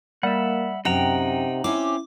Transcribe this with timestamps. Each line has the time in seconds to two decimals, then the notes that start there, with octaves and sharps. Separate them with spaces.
0.23 G3 A#3 E5 F#5
0.85 F#2 C3 D#4 F#5 G5 A#5
1.64 C4 C#4 E4 D6